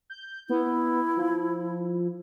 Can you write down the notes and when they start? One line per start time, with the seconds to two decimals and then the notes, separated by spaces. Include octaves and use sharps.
0.10 G6
0.49 B3 E4
1.17 F3